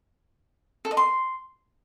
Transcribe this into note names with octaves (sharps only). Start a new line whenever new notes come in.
A4
D#5
C6